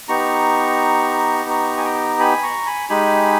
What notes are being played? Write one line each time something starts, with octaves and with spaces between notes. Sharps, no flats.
B3 D#4 G4 A#5 C#6
A#5 C#6
G#5
G5 A#5
G#5 B5
A#5 C#6
G#5 B5
G#3 D#4 G4 G#5 B5